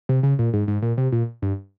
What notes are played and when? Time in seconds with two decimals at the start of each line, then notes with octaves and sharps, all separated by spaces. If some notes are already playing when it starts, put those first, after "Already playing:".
0.09 C3
0.23 C#3
0.39 A#2
0.53 G#2
0.68 G#2
0.82 A#2
0.98 C3
1.12 A#2
1.42 G2